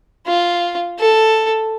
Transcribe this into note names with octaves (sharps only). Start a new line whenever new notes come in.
F4
A4